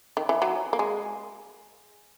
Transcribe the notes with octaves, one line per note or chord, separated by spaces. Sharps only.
D#3
E3
F#3
A#3
G#3